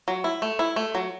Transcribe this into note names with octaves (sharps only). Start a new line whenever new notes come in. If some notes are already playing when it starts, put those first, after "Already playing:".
F#3
E4
A3
E4
A3
F#3